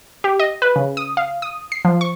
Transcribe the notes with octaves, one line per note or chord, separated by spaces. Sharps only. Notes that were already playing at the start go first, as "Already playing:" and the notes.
G4
D#5
B4
C#3
D#6
F5
D#6
C7
F3
C#6